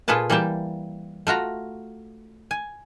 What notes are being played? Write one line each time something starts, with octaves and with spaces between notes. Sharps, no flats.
A#2 F4 G#4 A4 B4 A5
E3 G3 A#3 G5 A5
A3 F4 F#4 A#5
G#5